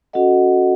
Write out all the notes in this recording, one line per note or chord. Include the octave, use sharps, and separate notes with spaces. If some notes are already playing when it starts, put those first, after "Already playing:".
C#4 F#4 A4 D#5 F#5